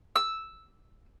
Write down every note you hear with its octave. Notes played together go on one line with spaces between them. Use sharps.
E6